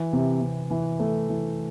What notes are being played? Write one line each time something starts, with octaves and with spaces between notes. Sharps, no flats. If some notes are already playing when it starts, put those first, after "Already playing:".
Already playing: E3
C3
C3
E3
A3
E3